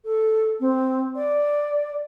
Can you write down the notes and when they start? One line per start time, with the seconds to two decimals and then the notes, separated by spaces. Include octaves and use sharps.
0.05 A4
0.60 C4
1.15 D5